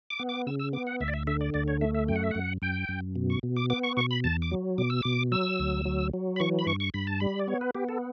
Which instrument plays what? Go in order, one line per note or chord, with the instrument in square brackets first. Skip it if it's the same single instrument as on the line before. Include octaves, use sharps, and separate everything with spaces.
[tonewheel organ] D6
B3
D6
C#3 E6
E6
B3 D6
F#5
D2 E5
D5
E5
D3 E5
D5
D2 D5
C#5
A3 E5
E5
F#2 G5
F#5
E5
F#2 F#5
F#2 G5
F#2
B2
C#6
B2
D6
B3 D6
C#6
B2 C#6
B5
E2 A5
D6
F#3
B2 D6
E6
B2 D6
F#3 E6
D2
F#3
F#3
B5
E3 C#6
B5
G2 C#6
C#6
G2 B5
A5
G3 B5
D5
B3 C#5
B4
B3 G4
A4